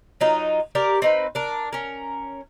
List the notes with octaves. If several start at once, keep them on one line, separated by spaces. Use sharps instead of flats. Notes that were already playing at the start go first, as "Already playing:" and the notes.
F#3 D#4 F4
G4 A#4 D5
C4 D#4 B4
D4 A#4
C#4 A#4